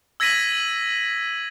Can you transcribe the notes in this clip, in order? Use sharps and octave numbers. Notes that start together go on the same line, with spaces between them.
E6 G#6 A#6 B6 D#7 F#7